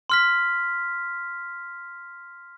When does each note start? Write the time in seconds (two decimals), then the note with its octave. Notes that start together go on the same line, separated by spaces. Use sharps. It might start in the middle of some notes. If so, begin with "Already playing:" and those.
0.10 C6 F6 B6